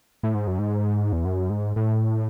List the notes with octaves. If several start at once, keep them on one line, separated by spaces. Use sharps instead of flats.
A2
G#2
F#2
G#2
E2
F#2
G#2
A2